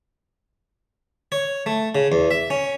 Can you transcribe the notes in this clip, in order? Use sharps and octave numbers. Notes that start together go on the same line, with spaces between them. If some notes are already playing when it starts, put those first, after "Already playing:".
C#5
A3
C#3
E2
E5
C#4